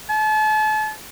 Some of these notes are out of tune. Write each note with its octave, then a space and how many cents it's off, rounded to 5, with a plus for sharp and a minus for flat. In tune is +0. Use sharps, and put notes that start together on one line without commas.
A5 -40